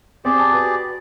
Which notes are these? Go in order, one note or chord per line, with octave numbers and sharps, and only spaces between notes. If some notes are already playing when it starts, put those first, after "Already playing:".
C4 G4 G#4 D5
A5
F#4 B4